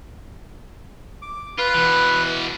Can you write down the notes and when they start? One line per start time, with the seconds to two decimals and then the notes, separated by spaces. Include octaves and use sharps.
1.22 D6
1.58 F4 B4
1.74 B2 E3